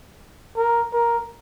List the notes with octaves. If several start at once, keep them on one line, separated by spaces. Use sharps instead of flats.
A#4
A#4